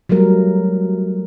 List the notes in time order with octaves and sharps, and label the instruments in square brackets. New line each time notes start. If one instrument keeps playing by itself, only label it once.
[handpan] F#3 G3 A3 A#4